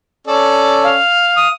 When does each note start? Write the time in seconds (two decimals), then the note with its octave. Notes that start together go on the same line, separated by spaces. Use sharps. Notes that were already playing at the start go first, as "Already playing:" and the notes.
0.27 C#4 A4 D5
0.84 F5
1.37 D#6